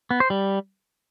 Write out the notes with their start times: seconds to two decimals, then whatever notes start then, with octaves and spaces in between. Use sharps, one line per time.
0.11 B3
0.20 C5
0.30 G3